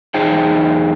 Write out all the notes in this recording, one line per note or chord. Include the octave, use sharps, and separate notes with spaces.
E2 D#4 G#4 C5 G5